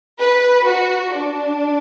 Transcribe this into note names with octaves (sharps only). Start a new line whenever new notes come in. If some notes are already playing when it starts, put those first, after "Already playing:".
B4
F#4
D4